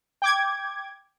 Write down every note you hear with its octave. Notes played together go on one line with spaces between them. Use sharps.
G5 D6 G#6